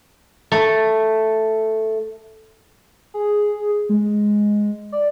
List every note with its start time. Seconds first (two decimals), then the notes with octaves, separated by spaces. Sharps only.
0.52 A3
3.14 G#4
3.89 G#3
4.92 D5